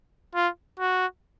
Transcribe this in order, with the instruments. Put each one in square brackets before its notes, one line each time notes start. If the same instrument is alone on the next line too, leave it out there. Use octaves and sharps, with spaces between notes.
[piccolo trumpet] F4
F#4